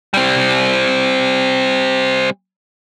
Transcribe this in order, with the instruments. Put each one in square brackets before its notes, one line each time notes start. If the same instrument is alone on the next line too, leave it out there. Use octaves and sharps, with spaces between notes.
[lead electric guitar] G3 C4